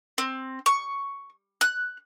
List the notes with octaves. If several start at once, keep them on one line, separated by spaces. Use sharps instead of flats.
C4
C#6
F#6